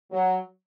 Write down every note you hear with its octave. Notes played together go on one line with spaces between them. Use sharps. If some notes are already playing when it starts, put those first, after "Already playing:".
F#3